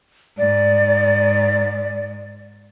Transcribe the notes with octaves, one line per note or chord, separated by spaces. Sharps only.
G#2 D5